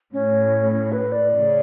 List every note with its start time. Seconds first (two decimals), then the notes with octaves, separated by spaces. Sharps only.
0.13 A2 C#4
0.73 C#4
0.92 B4
1.12 D5
1.32 C#3